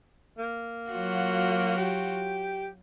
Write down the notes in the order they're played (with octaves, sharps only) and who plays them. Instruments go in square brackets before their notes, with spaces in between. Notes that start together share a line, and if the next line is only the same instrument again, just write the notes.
[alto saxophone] A#3
[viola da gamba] F#3 F4 F#4
[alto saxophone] G4